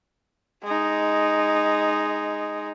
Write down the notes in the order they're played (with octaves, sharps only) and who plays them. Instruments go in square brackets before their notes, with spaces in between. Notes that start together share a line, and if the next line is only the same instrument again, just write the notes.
[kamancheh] G#3 D#4